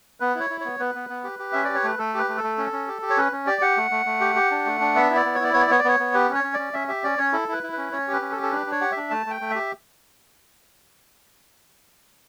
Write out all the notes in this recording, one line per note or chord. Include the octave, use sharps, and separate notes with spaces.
B3 B4
E4 C#5
E4
B3 C#5
B3 B4
B3
B3
G4
G4
C#4 E5
G4 D5
C#5
A3 B4
A3 A4
G4 B4
A3
A4
A3
C#4
C#4
G4
G4
C#5
C#4 B4
C#4
G4 D5
G4 F#5
A3
A3
A3
G4
G4
D4
A3
D4
B3 E5
E4
D5
B3
C#5
E4 D5
B3 C#5
D5
B3 C#5
D5
B3 C#5
B3
G4 B4
C#4
C#5
C#4
C#4 D5
C#4 E5
G4 E5
C#4 D5
C#4 C#5
E4 A4
E4 B4
E4
C#4 B4
C#4 C#5
G4 B4
C#4
A4
G4
A4
D4 B4
D4
C#5
G4 F#5
E5
D4
A3 A5
A3 G5
A3
G4 E5